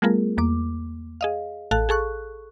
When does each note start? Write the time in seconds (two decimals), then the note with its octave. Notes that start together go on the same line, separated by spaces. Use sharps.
0.02 G3 A3 B3 F4 G#4 A#4
0.38 E2 A#3 D6
1.21 G#4 D#5 F5
1.71 A1 A4 F5 A5 F#6
1.89 G#4 A4 C#6 F#6